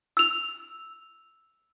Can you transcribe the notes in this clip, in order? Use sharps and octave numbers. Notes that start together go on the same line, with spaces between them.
E6 F7